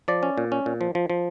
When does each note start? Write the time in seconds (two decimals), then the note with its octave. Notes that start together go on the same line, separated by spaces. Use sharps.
0.08 F3 D5
0.23 C#4
0.38 A#2
0.52 C#4
0.66 A#2
0.81 F3
0.95 F3
1.10 F3